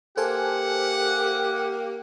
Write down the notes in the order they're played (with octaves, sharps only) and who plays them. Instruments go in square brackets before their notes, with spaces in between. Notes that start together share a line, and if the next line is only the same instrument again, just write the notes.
[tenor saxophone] A#3 [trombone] G4 [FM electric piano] A4 C5 G#5 [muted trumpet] F#5